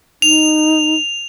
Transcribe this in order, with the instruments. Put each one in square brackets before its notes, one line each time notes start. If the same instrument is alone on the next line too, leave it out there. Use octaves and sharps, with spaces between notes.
[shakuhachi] D#4 [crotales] F7